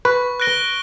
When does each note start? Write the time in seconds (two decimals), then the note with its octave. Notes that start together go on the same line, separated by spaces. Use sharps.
0.05 B4 C#6
0.40 F#6 A#6 D7 G7